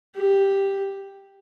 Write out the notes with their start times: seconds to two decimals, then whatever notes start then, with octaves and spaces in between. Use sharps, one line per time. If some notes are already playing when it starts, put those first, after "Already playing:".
0.16 G4